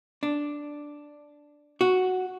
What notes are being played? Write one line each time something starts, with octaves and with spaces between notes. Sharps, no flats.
D4
F#4